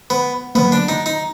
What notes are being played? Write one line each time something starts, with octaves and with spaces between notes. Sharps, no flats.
B3
D3 F#3 A#3 B3
D4
D#4
D#4